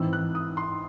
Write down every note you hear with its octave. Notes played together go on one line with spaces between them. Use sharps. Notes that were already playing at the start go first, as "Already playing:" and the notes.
Already playing: G#2 E3 C4 E6
F#6
D#6
C6